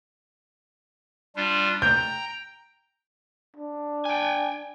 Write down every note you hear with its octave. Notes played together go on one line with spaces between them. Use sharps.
G3 D4 F4
G5 A#5 G6
D4
G5 G#5